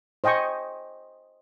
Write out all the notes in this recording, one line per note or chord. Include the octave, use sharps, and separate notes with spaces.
C5 D#5 G5 G#5 C#6